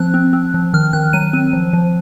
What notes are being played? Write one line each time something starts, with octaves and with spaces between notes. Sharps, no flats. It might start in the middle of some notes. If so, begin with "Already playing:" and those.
Already playing: F3 C4 F#6
C4
C4
F3
D#3 F6
D#3 F#6
F#3 D#7
C4
F3
F3